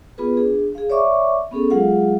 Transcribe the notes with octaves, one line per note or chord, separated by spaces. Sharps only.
B3 F4 G#4 B4
D4 G#4
G#4 F5
C#5 D5 E5 C#6 D6
B3 C#4 G#4 A4
F#3 G#3 F4 G#4 F5 F#5